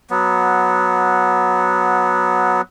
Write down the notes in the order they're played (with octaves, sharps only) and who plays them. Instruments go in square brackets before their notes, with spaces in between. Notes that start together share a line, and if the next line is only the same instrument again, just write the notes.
[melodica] F#3 B3